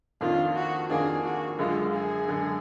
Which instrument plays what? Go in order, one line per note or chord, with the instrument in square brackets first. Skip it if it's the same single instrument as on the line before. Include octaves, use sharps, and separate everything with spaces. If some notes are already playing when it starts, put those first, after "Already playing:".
[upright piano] F2 D#3 A#3 D4 [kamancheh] F4
[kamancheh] F#4
[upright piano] F2 D#3 A#3 D4 [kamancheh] G#4
[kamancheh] F#4
[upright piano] F#2 D3 G#3 [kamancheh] F4
[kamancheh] G#4
[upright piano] F#2 D3 G#3